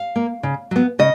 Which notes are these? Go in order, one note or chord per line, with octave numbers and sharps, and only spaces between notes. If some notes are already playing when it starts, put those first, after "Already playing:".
Already playing: F5
A#3
C#3
F#3 B3
C#3 D#5